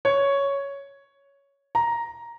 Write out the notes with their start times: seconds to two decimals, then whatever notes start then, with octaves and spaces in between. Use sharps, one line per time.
0.05 C#5
1.75 A#5